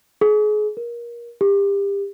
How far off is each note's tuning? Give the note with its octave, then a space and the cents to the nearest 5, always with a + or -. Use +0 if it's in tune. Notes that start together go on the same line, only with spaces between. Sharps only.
G#4 +30
A#4 +25
G4 +30